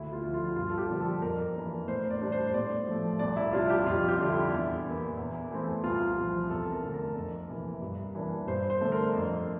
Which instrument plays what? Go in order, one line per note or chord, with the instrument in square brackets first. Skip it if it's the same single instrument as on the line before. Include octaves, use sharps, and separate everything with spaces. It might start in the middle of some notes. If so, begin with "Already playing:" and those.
Already playing: [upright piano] D2 E4
F4
D3 F3
F4
G2 F4
A4
G4
D3 F3 A#3 D4
A4
F2 A#4
E3 A#3 D4
A2 C5
D5
G3 D4
C5
A2 D5
F3 A3
C2 D5
E4
C3 G3 D4 F4
G4
F2 F4
G4
D3 G3 D4
E4
E2
E3 A#3
E2
E3 A3 C4
C2 F4
C3 F3 C4
E2 A4
A#4
D3 A3
A#4
F2
C3 E3 A#3
G2
E3 A#3 D4
G2 C5
C5
D3 A3 D4
A#4
F2